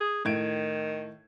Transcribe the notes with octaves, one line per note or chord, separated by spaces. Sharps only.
G#4
A2 D#3 G#6 D7